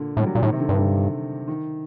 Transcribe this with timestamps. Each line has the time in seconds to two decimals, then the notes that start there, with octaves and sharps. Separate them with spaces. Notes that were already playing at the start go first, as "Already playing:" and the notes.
Already playing: A#2 D3
0.17 A2 G3
0.26 F#3
0.35 A#2
0.43 A2 D#3
0.52 C3
0.60 D3
0.69 G2
0.79 D3
1.48 D#3